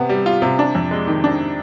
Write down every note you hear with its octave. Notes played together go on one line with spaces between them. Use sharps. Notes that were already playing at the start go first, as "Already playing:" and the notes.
Already playing: C3 B3
G3
F4
C3
D4
F2
G#3
D#3
D4